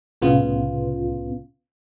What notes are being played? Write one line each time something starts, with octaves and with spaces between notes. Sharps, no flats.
C2 A2 C#3 B3 F4